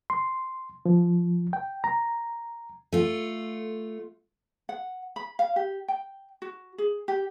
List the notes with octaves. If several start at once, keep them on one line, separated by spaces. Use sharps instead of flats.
C6
F3
G5
A#5
A3 F4
F#5
B5
F5
G4
G5
F#4
G#4
G4